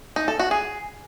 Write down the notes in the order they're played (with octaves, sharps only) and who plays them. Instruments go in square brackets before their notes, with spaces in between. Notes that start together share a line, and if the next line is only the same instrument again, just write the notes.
[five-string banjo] D#4
A4
F#4
G#4